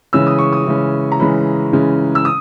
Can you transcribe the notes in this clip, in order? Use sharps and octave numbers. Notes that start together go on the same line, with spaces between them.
C#3 E3 G#3 C#4 E6
D#6
C#6
D#6
C#3 E3 G#3 C#4
A#5
C#3 E3 G#3 C#4 B5
C#3 E3 G#3 C#4
E6
D#6